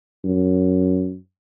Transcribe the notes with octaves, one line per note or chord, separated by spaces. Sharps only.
F#2